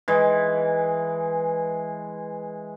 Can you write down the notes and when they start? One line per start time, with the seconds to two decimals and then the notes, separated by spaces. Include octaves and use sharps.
0.08 E3 G#3